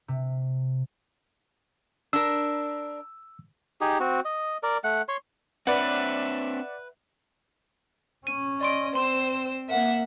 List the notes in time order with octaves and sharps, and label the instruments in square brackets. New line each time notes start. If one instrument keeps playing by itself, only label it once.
[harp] C3
[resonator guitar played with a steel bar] D4 A#4 [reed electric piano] E6
[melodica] D#4 G4 G#4
C4 F#4
D#5
A#4 D5
A3 F#5
C#5 C6
[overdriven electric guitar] C4 D4 [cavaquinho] B4 [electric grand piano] D5 F#5 [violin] E5
[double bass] C#4 [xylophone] D#7
[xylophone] D5 C6 D7 [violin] D#5
[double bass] C4 [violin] C5 E6 [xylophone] C6
[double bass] A#3 [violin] E5 F#5